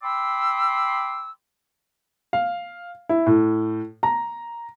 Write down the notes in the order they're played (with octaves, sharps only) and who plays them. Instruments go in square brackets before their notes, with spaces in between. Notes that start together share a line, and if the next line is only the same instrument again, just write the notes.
[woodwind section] G5 B5 C6 D6 E6
[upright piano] F5
E4
A2
A#5